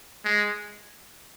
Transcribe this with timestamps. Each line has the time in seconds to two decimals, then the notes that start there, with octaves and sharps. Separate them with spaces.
0.25 G#3